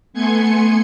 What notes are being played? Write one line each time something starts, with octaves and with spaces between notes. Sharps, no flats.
A3 B3 G#5 C6 G#6 C#7